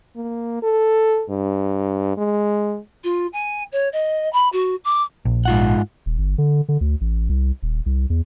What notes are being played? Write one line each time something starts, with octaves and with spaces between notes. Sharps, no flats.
A#3
A4
G2
G#3
F4
G#5
C#5
D#5
B5
F#4
D6
A#1
G#2 F4 F#5
D#1
G1
D3
D3
D2
A1
C2
D#1
C2
E2